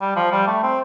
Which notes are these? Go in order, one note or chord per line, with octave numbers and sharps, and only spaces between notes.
G3
F3
G3
A3
C4